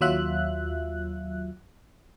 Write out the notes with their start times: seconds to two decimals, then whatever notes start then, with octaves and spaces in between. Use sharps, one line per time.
0.01 D#2 F#3 F4 E5 F#6